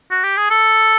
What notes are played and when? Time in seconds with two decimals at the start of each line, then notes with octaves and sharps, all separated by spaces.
0.11 F#4
0.24 G4
0.37 G#4
0.50 A4